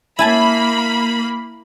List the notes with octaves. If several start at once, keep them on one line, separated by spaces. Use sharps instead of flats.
A#3 E4 G#5 A5 B5